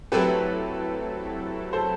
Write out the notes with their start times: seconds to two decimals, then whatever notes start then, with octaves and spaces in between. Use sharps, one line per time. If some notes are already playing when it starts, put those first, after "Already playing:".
0.12 F#3 A3 C4 E4 G4 A4 B4
1.73 A4 C5